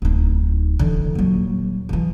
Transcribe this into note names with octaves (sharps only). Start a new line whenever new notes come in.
D1 D#4
D3 E3
D#1 F#3
D#3 E3